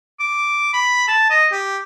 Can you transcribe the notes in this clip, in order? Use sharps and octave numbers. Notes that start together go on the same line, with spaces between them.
D6
B5
A5
D#5
G4